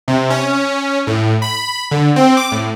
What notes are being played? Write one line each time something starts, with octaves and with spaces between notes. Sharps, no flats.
C3
C#4
A2
B5
D3
C4
D6
A2